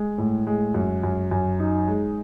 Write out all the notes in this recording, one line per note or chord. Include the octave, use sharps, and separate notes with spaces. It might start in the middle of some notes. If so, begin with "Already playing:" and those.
Already playing: G#3
A2
G#3
F#2
F#2
F#2
D#4
G#3